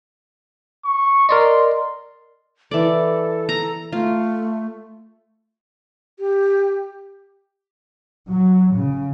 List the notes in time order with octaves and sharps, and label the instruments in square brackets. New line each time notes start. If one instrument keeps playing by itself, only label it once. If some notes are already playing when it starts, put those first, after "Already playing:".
[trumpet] C#6
[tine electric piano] A#4 D5 D#5 [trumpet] C6
[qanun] E3 D5 [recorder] A4
[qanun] A#5
[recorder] A3 [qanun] F4
[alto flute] G4
[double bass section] F#3
C#3